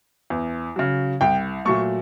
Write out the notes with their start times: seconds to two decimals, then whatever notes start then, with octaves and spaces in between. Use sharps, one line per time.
0.30 E2
0.76 C#3 F#3
1.21 C2 G5
1.65 A#2 F#3 A3 C#6